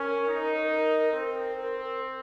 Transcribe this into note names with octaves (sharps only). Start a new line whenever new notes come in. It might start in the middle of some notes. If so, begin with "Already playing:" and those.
Already playing: C#4 A#4
D#4
A#4
C4 A#4